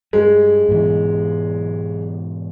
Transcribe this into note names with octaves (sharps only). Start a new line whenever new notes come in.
G2 G#3
G#2 B2 E3